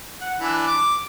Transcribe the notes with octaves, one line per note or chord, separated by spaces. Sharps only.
F#5
E3 D4
D6